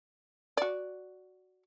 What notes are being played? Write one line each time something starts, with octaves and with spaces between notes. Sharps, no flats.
F#4 D5